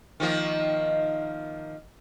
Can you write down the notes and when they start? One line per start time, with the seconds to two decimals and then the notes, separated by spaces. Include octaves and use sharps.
0.20 D#3 F3 A#3